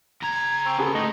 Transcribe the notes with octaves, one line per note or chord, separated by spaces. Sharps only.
C#3 A#5 G#6
C4 C#6
B3 C#4 G#4 A4
A2 D#4 C6